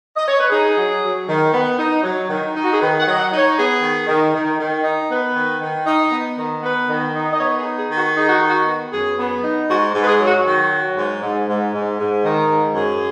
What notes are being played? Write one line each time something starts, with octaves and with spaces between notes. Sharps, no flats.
D#5
C#5
B4
D#4 G#4
F#3
F#3
D#3
B3
D#4
F#3
D#3
D#4
F#4
G#4
D#3 B4
F#5
F#3 D#5
F#5
D#4
C#5
B3 G#4
D#3
D#3
D#3
D#3
D#4
B3 B4
D#3
D#3
D#4
B3
D#3
B3 B4
D#3
D#4
D#5
B3 C#5
G#4
D#4
G#4
D#3
F#4
D#4 G#4
F#4
D#3
F#4
B3
F#2 G#4
B3
D#4
G#2 F#4
G#2
B4
G#4
F#3
F#4
D#3 F#4
F#3
G#2
G#2
G#2
G#2
G#2
D#3
G#2
F#2 G#4